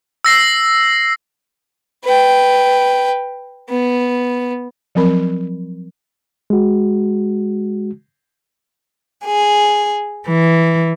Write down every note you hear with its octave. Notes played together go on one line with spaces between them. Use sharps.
E6 A#6 C7
B4 G5
B3
F3 F#3 C4 A#4 B5
G#3 F#4
G#4
E3